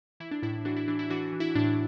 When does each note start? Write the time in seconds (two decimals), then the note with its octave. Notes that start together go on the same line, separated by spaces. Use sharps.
0.20 E3 E4
0.31 D4
0.42 A2 E4
0.65 E3 D4 F#4
0.76 E4
0.88 E3 D4
0.99 E4
1.10 E3 D4 F#4
1.33 E3
1.40 E4
1.55 A2 D4